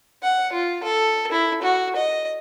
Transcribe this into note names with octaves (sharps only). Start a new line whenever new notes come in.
F#5
F4
A4
E4
F#4
D#5